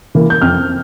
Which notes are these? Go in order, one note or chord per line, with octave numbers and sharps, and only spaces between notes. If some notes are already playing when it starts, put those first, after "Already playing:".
E3 A#3
G6
F2 F6